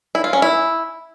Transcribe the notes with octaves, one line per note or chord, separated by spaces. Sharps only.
E4
F4
C#4
E4